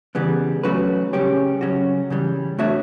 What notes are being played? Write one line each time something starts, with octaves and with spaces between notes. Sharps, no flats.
C#3 E3 G3 B3
F#3 A3 C#4 F#4 B4
C#3 G3 C#4 G4 C#5
C#3 F#3 C#4 F#4
C#3 E3 G3
A3 D4 F#4 C#5 E5